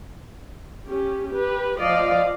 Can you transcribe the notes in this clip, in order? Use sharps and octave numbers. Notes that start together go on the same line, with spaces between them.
C#4 G4
G4 B4
F3 D5 D#5 F5